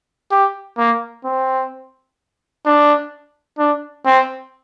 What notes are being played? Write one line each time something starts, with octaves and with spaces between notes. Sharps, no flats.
G4
A#3
C4
D4
D4
C4